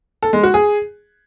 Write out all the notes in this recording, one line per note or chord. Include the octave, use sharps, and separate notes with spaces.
A4
G#3
F#4
G#4